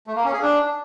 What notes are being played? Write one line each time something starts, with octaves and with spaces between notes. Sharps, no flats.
A3
A#3
C#4
G#4
D4